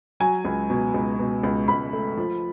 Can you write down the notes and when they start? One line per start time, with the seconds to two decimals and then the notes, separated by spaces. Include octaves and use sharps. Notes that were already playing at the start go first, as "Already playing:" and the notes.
0.20 F#3 G#5
0.45 C#2
0.70 B2
0.94 C#2
1.19 B2
1.43 C#2
1.68 C#2 B5
1.93 A3
2.17 F3